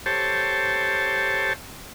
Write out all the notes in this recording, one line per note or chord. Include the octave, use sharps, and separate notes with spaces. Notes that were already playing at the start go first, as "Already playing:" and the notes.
G4 A4 C5 C#5 A5